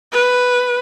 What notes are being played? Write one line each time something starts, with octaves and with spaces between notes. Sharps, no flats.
B4